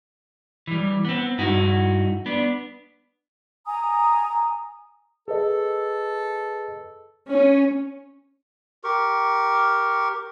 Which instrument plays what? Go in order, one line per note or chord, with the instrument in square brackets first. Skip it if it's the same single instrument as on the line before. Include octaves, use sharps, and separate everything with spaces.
[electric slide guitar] E3 G3
B3 C4
G2 D#4 E4 F#4
B3 D4
[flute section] G#5 A#5 D#6
[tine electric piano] G#4 B4 D#5 [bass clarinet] A4
[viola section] C#4
[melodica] G4 A#4 C#6